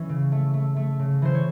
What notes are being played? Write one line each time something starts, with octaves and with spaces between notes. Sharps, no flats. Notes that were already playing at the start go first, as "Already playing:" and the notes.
Already playing: E3 A3 C#4
C#3
A3
A3
A3
C#3
E3 C5
C#5